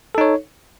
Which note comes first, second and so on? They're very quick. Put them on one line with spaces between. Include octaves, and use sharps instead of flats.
A4 D#4 C#5